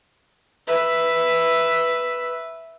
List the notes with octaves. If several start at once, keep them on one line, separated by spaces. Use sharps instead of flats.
B4 E5